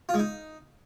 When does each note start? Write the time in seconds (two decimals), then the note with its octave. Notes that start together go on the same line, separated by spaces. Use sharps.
0.09 F4
0.14 G#3
0.19 D#4